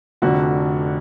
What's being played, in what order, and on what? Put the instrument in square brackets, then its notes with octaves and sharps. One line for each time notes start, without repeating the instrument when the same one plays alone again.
[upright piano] F1 F2 D3 F#4